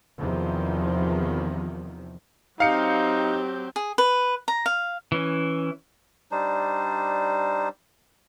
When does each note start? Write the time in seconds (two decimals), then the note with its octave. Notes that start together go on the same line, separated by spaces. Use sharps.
0.18 E2 C3 D#3 F3
2.60 F#3 C4 D#4 G4 F5 C#7
3.76 G#4
3.98 B4
4.48 A#5
4.66 F5
5.12 E3 C#4
6.31 G3 D4 D#4 C5